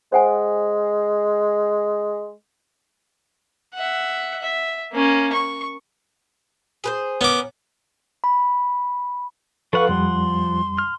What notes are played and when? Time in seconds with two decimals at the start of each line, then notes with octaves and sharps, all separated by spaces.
0.12 G#3 C5 F#5 G#5
3.74 E5 F#5
4.42 E5
4.93 A#3 C#4
5.33 C#6
6.84 G#4 B4 C5
7.21 B3 C#4 A#4 D6
8.24 B5
9.73 F3 A4 B4 F5 F#5 C#6 F#6
9.89 F2 G3 C6
10.78 F6